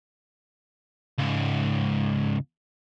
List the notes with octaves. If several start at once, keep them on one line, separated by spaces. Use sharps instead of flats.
C#2 G#2